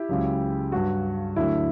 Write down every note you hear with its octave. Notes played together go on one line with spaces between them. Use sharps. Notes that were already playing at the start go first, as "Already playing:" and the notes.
Already playing: E4 G4
C#2 C#3 F#3
G2 F#3 F#4
D2 D3 F#3 E4